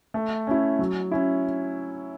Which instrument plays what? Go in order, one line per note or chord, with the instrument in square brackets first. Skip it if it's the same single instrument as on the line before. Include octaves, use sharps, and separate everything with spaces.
[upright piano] A3
C#4 E4
F#3
C#4 E4